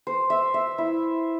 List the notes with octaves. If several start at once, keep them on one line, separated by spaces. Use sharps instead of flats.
C5
E5
E5
E4